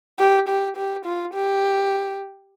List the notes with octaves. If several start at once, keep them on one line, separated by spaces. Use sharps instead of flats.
G4
G4
G4
F4
G4